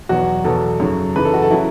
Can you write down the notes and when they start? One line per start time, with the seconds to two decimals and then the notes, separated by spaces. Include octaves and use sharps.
0.09 E2 B2 F#3 F#4
0.45 E2 B2 F#3 A4
0.80 F#2 C#3 F#3
1.16 F#2 C#3 E3 B4
1.25 A4
1.34 F#4
1.42 A4
1.51 C#3 F#3 E4